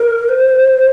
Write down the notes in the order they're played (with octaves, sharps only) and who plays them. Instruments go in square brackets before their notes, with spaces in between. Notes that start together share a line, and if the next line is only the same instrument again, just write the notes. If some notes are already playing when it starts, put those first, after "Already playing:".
Already playing: [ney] A#4
C5